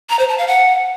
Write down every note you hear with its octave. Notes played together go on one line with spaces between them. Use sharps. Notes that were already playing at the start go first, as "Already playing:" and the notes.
A#5
C5
A5
F5
F#5